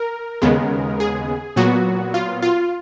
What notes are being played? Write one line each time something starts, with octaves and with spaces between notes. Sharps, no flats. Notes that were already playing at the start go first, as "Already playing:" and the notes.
Already playing: A#4
D#2 C#3 G#3 B3
G#4
A#2 F#3 B3 F#4
F4
F4